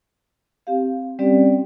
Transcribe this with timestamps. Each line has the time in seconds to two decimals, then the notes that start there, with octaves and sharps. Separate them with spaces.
0.67 C4 G4 F5
1.19 G3 C4 C#4 G4 D5